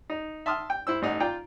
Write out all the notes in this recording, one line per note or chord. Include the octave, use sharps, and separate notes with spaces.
D#4
E5 A5 C6 D#6 F6
G5
E4 C5 E6
A1 D#4 F#5
F4 D5 G5 A#5